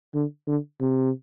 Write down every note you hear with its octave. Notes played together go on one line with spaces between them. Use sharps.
D3
D3
C3